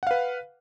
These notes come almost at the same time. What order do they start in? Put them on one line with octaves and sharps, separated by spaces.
F#5 F5 B4